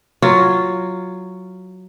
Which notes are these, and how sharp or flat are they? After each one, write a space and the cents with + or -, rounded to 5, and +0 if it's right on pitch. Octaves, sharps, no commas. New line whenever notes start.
F#3 +0 F4 +0